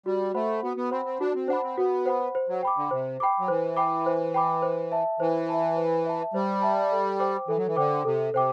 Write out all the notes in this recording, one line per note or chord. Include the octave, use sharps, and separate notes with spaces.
G3 F#4
A3 C5 F#5 B5
B3 F#4
B3
C4 C5 F#5 B5
C4
D4 F#4
C4
D4 C5 F#5 B5
C4
B3 F#4
C5 F#5 B5
C5
F#3
G5 B5 D6
D3
C3 C5
G5 B5 D6
F#3
E3 C5
G5 B5 D6
C5
G5 B5 D6
C5
E5 A5
E3 C5
E5 A5
C5
E5 A5
G3 C5
E5 A5
A4
C5 G5 D6
E3 A4
F#3
E3
D3 C5 G5 D6
C3 A4
C3 C5 G5 D6